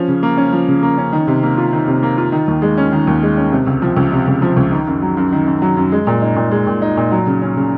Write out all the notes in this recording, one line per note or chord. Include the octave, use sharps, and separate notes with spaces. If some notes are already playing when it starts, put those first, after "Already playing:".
Already playing: F3 C#4
C#3
A#3
C#4
F3
C#3
A#3
C#4
D#3
C3
A#3
F4
D#3
C3
A#3
F4
D#3
D#2
G#3
C#4
D#3
D#2
G#3
C#4
C3
C#2
F3
C#2
C3
C#2
F3
C#2
D#3
F#2
F#3
F#2
D#3
F#2
F#3
F#2
G#3
A#2
D#4
A#2
G#3
A#2
D#4
A#2
F#3
C#3
C#4
C#3